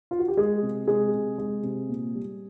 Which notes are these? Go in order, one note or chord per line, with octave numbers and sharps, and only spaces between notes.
F4
F#4
G4
G#3 G#4
C3
C3 G#3 G#4
C3
G#3
C3
A#2
G3